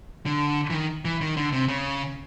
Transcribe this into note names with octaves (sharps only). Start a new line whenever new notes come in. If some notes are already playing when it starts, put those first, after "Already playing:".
D3
E3
D#3
E3
D#3
D3
C3
C#3